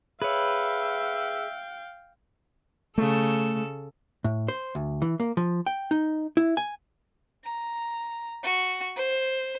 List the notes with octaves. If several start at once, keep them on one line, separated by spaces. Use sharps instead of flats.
G#4 B4 C#5 E5 F5 G5
C#3 A3 A4
A2
C5
D2
E3
A#3
F3
G5
D#4
E4
G#5
A#5
F#4
C5